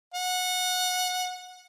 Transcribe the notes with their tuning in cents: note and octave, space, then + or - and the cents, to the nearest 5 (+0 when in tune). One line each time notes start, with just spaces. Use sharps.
F#5 -20